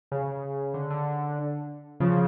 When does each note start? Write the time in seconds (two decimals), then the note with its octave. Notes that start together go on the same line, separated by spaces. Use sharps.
0.12 C#3
0.74 D3
0.90 D3
2.00 C#3 F3